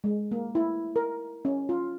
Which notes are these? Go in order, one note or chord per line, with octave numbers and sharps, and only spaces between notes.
G#3
A#3
E4
A#4
C#4
F4